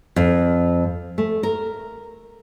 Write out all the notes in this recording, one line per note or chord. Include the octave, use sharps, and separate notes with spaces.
F2
A3
A#4